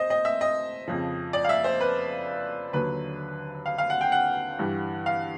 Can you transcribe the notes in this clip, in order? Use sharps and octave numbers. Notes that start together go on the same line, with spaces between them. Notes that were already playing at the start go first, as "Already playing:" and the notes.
Already playing: C5 D#5
D#5
E5
D#5
F2 C#3 F3
D5
F5
E5
C5
B4
D#2 D3 F#3 B4
F5
F5
F#5
G5
F#5
G2 E3 G3
F5